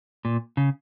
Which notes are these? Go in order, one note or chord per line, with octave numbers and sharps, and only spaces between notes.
A#2
C#3